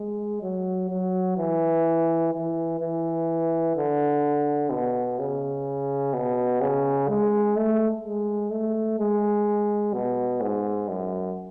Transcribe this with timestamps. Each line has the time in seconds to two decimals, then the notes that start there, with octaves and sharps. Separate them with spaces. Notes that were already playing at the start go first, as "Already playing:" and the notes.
Already playing: G#3
0.42 F#3
0.90 F#3
1.37 E3
2.33 E3
2.80 E3
3.76 D3
4.70 B2
5.19 C#3
6.13 B2
6.61 C#3
7.09 G#3
7.56 A3
8.03 G#3
8.51 A3
8.99 G#3
9.94 B2
10.41 G#2
10.89 F#2